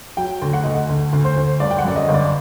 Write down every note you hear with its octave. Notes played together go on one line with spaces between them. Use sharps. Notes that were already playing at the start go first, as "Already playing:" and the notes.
F#3 G5
D2
F#5
D2 D#5
F#5
D2
D2
C5
D2
G1 D5
G5
F#5
F#2 D5
D#5
G1
D5